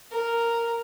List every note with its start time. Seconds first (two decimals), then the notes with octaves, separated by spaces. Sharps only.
0.11 A#4